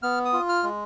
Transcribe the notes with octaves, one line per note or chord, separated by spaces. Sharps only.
B3 F6
D#6
F4
F6
G#3